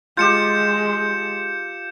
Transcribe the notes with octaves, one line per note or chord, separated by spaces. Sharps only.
G#3 F4 G4 G6 C#7 E7